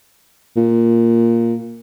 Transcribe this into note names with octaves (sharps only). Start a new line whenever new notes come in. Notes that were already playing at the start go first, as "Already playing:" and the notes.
A#2